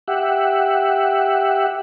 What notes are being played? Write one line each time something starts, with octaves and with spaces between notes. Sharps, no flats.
G4 E5 F#5